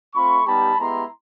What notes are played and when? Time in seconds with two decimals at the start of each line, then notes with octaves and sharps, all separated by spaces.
0.15 A3 C4 F4 B5 C#6
0.47 G3 B3 D#4 G4 A5 B5
0.78 G#3 B3 E4 G4 A#5 C6